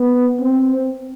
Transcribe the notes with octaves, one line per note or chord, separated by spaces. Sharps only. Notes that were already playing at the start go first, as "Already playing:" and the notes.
Already playing: B3
C4